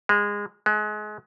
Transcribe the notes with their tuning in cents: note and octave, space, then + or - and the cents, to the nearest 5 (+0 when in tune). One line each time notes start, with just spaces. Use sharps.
G#3 -20
G#3 +30